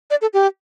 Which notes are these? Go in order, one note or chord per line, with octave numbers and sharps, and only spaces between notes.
D5
A4
G4